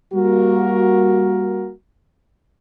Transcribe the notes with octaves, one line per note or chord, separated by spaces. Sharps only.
G3 A#3 F#4 A#4